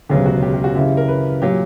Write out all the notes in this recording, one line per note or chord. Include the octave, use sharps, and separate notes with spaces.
E1 D2 C#3 F#3 B3 G4
F#4
G4
G4
F#4
F#2 C#3 E3 G4
A#4
B4
A#2 F#3 G4